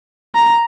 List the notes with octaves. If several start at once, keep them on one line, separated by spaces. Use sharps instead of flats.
A#5